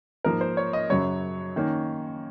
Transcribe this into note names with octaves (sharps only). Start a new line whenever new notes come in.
G#2 F3 A#3 A#4
C5
C#5
D#5
F#2 C#3 F#3 C#5
D#3 A#3 C#4